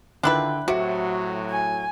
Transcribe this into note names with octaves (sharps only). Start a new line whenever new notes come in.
D3 D#3 D4 E4 F4 B4 G5 F#6
A2 C3 F#3 F#4
G#5